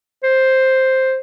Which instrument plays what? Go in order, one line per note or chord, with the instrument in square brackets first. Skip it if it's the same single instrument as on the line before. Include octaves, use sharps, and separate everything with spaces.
[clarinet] C5